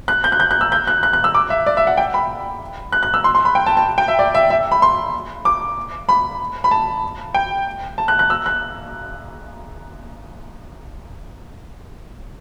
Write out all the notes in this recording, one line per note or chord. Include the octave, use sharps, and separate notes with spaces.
F#6
G6
F#6
G6
F#6
E6
G6
F#6
F#6
F#6
E6
D6
E5
D5
E5
F#5
G5
B5
F#6
F#6
E6
C6
C6
B5
G5
A5
A5
G5
E5
D5
E5
E5
B5
C6
D6
B5
B5
A5
G5
A5
F#6
F#6
E6
F#6